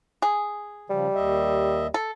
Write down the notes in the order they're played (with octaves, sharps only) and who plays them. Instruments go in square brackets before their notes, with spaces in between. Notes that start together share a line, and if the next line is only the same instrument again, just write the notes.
[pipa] G#4
[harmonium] C#3 F3 [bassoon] G3
[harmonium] D#2 D#5 E5
[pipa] A4